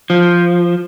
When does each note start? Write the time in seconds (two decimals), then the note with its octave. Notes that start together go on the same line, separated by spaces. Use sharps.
0.10 F3